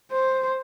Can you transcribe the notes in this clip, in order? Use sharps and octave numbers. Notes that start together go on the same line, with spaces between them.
C5